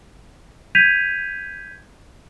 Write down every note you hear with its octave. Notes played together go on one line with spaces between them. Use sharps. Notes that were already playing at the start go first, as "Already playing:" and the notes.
G6 G#6 B6 D#7 F7